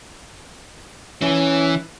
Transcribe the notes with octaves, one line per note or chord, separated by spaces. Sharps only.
E3 C#4